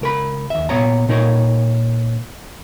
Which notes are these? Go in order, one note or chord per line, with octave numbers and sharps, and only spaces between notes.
C#2 A#4 B5
D#2 E5
A#2 B3 C#5 A#5
A#2 D#4 A#4 C#5